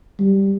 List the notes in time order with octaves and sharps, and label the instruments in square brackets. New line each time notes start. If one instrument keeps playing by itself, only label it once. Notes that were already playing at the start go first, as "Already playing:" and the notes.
[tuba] G3